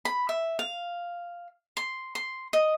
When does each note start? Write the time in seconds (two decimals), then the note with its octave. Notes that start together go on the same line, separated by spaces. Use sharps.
0.05 B5
0.29 E5
0.59 F5
1.77 C6
2.15 C6
2.53 D#5